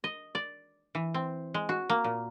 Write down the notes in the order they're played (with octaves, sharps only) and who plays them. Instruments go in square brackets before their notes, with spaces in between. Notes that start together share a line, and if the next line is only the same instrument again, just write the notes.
[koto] D#5
D5
E3
C4
G#3
F#4
A#3
A#2